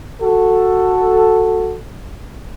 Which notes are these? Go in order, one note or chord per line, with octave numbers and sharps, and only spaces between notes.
F#4 A4